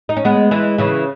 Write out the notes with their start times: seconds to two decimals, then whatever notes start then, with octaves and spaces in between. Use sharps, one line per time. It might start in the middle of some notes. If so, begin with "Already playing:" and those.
0.09 D#4
0.17 C#4
0.25 G#3 B3
0.51 E3 G#3
0.78 C#3 E3